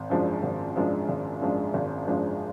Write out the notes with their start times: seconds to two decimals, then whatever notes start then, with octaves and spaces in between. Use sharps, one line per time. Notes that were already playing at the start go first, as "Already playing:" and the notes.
Already playing: G#1
0.10 F#2 F3 G#3 D4
0.43 G#1
0.76 F#2 F3 G#3 D4
1.09 G#1
1.42 F#2 F3 G#3 D4
1.74 G#1
2.07 F#2 F3 G#3 D4